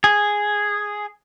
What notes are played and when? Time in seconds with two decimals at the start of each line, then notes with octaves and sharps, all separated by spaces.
0.04 G#4